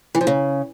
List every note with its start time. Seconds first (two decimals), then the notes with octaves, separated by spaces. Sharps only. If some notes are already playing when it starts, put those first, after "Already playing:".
0.15 E3
0.21 F3
0.27 C#3